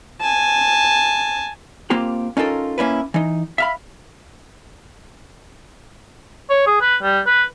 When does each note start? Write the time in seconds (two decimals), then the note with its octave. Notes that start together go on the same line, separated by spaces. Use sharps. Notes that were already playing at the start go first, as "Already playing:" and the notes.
0.21 G#5 A5
1.90 A#3 C4 F4 G4
2.37 C#4 D#4 F4 A4 A#4
2.78 A#3 C#4 E4 B4
3.14 E3 D#4
3.58 E5 F5 B5
6.50 C#5
6.67 G#4
6.81 B4
7.02 G3
7.26 B4